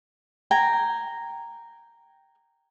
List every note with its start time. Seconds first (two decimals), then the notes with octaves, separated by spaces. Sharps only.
0.51 G5 G#5 A#5